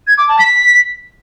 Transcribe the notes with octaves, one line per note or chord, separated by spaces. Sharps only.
G#6
D6
A5
B6